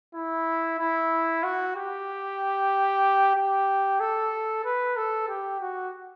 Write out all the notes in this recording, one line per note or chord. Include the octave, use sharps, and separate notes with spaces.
E4
E4
F#4
G4
G4
A4
B4
A4
G4
F#4